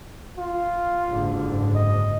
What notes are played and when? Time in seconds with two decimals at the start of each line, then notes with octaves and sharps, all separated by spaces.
0.38 F4
1.08 F#1 G#2 D3
1.75 D#5